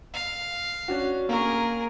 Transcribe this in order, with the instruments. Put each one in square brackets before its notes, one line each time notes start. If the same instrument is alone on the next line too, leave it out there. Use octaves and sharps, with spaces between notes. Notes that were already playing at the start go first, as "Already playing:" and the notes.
[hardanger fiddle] F5
[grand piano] C#4 D4 F#4
[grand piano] A#3 C#6 [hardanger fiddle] G#4 A#4